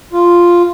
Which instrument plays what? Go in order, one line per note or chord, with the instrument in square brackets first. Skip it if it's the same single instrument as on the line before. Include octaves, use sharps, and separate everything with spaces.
[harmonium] F4